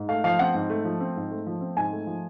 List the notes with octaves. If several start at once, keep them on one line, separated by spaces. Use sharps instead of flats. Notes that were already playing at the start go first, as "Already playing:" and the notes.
Already playing: G#2
A3 F5
F3 F5
C4 F#5
G#2
A3
F3
C4
G#2
A3
F3
C4
G#2 G#5
A3
F3